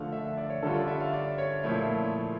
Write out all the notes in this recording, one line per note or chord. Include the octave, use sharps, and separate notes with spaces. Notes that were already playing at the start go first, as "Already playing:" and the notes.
Already playing: D3 F3 A3 A4 F5
E5
E5
D5
C#5
D3 G3 C#4 F4 A4
D5
E5
F5
D5
C#5
A#2 F3 A3 E4